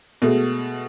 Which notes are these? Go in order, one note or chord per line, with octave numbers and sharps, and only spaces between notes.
B2 G#3 A3